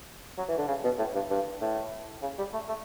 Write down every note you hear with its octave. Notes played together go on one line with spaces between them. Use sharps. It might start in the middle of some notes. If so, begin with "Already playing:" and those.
F#3
E3
D3
C#3
B2
A2
G2
G2
A2
C#3
G3
A3
A3